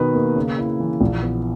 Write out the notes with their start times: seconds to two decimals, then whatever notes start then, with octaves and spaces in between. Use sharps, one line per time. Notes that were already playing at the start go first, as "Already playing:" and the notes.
Already playing: B2 D#3 B4
0.14 A#3
0.36 C#3
0.58 E4
0.80 E3
1.01 A#1
1.22 B3